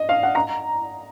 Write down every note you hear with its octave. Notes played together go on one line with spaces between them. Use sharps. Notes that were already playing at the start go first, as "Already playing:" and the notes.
Already playing: D#5
F5
F#5
A#5